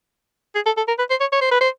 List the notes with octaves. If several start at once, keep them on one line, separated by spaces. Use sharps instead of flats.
G#4
A4
A4
A#4
B4
C5
C#5
C#5
C5
B4
C5